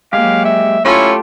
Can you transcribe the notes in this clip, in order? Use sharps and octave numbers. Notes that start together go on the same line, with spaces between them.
F#3 G#3 A#3 G4 F5
E5
A3 C#4 E4 F4 G4 A4